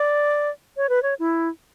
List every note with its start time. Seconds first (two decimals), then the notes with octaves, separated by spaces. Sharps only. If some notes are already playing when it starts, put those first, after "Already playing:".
Already playing: D5
0.77 C#5
0.89 B4
1.03 C#5
1.19 E4